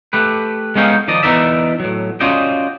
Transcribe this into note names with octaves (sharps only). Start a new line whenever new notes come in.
A3 G4 B4
G#3 B3 C#4 D#4 F5 G5
D#3 F3 D5 D#5
E3 B3 D#4 A#4 D5 E5
A2 F#3
C#4 F4 F#4 D5 D#5 G5